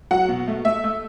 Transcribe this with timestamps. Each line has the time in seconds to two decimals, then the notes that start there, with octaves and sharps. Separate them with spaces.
0.11 F#3 F#5
0.28 B2
0.48 A3
0.65 A3 E5
0.84 A3